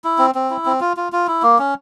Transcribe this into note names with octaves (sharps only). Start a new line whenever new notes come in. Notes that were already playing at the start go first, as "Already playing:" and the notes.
E4
C4
C4
E4
C4
F4
F4
F4
E4
A#3
C#4